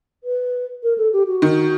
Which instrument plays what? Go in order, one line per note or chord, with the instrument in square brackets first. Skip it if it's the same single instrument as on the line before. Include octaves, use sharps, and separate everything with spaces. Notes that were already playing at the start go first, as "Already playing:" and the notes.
[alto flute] B4
A#4
A4
G4
F#4
[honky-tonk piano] D#3